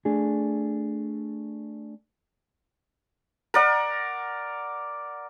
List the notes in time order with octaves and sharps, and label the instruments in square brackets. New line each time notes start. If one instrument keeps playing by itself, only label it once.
[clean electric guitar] A3 D4 G#4
[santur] A#4 D5 F#5